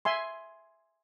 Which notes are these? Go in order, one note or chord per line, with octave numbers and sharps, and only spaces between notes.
E5 G#5 C6